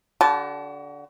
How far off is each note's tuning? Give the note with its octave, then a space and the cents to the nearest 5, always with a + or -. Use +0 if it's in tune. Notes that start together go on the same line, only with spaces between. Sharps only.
D3 -20 F#4 +35 A5 -25